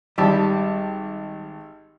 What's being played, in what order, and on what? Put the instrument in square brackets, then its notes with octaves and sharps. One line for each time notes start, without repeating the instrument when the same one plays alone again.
[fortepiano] G#1 G4 A5 [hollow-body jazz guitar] G3